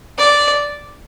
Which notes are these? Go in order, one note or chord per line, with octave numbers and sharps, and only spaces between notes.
D5